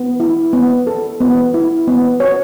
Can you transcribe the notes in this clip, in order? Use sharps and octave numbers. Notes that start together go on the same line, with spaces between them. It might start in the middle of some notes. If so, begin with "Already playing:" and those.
Already playing: B3
E4
B3
A4
B3
E4
B3
C#5